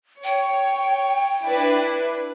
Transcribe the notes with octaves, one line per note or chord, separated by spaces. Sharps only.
C#5 G5
D4 E4 B4